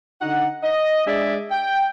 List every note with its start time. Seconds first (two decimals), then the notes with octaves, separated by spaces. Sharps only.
0.20 D3 D#4 F#5
0.63 D#5
1.06 G#3 D4 G#4 D5 E5
1.50 G5